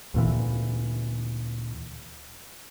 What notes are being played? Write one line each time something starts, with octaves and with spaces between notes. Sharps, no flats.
D2 A#2 E3